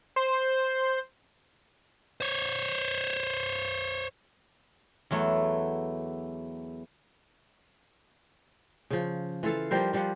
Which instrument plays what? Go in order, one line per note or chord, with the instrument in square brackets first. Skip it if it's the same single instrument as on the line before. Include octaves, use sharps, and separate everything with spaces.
[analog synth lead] C5
[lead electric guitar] C5 C#5
[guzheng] E2 F#3 A3
[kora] C#3 F3
E3 F4 A4 F5
F3 G3 A#4 C5
F3 G3 F4 F#5